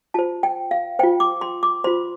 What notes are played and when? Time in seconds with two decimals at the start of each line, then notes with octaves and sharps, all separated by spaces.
0.14 F4 C5 A5
0.43 G5
0.71 F5
0.99 F4 C5 G5
1.20 D6
1.41 C6
1.63 D6
1.84 F4 C5 C6